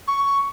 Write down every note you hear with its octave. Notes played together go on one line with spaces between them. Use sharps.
C#6